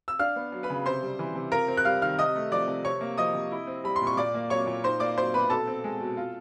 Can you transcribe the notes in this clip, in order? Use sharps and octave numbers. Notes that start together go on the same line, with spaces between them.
E6
D4 F5 F6
B3
F#3
B4 B5
C#3
C3 C5 C6
G3
E3
C3
F4 A#4 A#5
C4
F#6
G3 F5 F6
D#3 F5 F6
C3 D#5 D#6
A3
F3 D5 D6
C3
C3 C#5 C#6
A#3
F3 D#5 D#6
C3
E4
C4
G3 B5
C6
A#2
C#6
A#2 D5 D6
A#3
F#3 C#5 C#6
A#2
D#4 C5 C6
A#3 D5 D6
F#3 C5 C6
B2 B4 B5
B2 A4 A5
C4
G#3
B2
F4